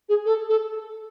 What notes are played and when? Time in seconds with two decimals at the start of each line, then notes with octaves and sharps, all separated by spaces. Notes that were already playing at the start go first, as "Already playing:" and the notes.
0.09 G#4
0.25 A4
0.49 A4